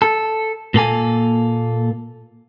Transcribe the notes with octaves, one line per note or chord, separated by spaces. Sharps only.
A4
A#2 A#3 A4 G#5